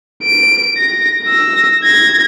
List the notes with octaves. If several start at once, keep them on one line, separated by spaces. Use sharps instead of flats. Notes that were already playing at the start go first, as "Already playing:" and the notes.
D7
A#6
E6 A#6
G#6 A#6